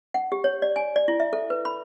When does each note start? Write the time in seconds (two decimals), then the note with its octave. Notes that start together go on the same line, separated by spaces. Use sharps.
0.14 F#5
0.32 G4
0.44 C#5
0.62 D5
0.76 G#5
0.96 D5
1.08 E4
1.20 E5
1.33 A4
1.50 B4
1.65 B5